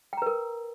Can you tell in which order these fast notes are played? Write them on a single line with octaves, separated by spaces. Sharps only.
G5 A#5 B4 A#4